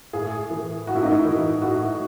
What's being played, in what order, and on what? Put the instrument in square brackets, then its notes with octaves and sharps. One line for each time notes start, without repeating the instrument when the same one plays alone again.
[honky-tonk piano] A2 G#4
E3
A2 F#4
E4
D#4
E4
E3
A2 F#4